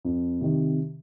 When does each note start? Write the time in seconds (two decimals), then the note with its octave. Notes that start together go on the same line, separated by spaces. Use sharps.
0.05 F2
0.41 C3 D#3